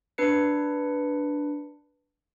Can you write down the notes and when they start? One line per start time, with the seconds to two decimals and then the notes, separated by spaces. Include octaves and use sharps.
0.18 D4 B4 C#7